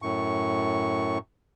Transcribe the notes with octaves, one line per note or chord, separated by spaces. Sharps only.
F#2 A2 C#6